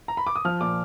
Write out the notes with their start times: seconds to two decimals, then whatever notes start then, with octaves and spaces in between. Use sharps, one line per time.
0.08 A#5
0.17 B5
0.27 D6
0.36 D#6
0.45 F3 F6
0.61 A#2 D6